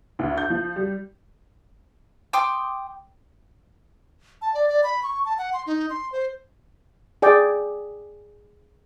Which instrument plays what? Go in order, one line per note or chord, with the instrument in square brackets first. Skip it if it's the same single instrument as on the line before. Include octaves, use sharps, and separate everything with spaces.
[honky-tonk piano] D2
G6
F3
G3
[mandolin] G5 C6 D6 D#6
[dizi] A5
D5
D5
B5
C#6
A5
F#5
C6
D#4
C6
C5
[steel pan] G#4 D5 G5